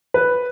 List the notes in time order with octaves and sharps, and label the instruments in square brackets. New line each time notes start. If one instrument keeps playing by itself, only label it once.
[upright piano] B4